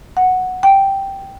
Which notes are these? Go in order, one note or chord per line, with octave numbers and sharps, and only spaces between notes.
F#5
G5